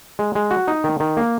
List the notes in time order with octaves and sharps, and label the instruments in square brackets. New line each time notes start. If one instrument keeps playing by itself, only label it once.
[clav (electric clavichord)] G#3
G#3
F#4
D#4
D#3
D#3
A#3